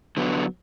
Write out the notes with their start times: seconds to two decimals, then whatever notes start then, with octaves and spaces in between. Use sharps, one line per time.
0.17 D3 F#3 B3